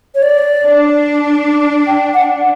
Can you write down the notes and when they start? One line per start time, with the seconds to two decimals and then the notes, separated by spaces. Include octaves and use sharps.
0.15 C#5
0.22 D5
0.63 D4
1.87 G5
2.14 F#5